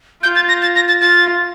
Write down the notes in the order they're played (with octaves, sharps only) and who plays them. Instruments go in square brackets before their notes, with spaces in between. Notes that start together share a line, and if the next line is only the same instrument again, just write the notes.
[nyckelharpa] F4 [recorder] G6
[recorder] A6
A#6
A6
A#6
A6
[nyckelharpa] F4 [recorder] A6